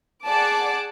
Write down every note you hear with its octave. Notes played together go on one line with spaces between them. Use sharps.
G#4 D5 F#5 A5 D6